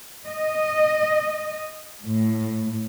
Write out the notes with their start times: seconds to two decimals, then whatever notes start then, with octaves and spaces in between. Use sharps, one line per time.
0.26 D#5
2.04 A2